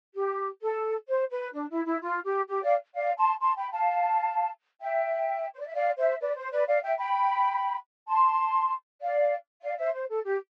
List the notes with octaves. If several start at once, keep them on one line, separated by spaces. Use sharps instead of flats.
G4
A4
C5
B4
D4
E4
E4
F4
G4
G4
D5 F5
D5 F5
A5 C6
A5 C6
G5 B5
F5 A5
E5 G5
C5
D5
E5
D5 F5
C5 E5
B4 D5
C5
B4 D5
D5 F5
E5 G5
G5 B5
A5 C6
D5 F5
D5 F5
C5 E5
C5
A4
G4